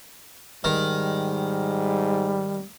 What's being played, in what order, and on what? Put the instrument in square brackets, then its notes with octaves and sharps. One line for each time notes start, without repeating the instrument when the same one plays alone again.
[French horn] G#2 [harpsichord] D#3 [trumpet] G3